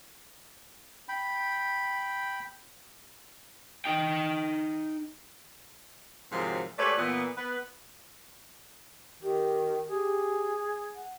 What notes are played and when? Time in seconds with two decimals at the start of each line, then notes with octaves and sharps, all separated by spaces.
1.09 G5 B5
3.85 D#4 G5
6.32 G#2 C3 D#3 F3 F#3
6.78 G#3 A3 G4 B4 C#5 D5
6.97 A#2 E3 B3
7.36 B3 B4
9.22 D#3 G4
9.88 G4 G#4
10.95 F#5